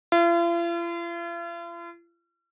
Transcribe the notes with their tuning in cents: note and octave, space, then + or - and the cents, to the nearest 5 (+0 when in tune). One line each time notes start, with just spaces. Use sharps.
F4 -45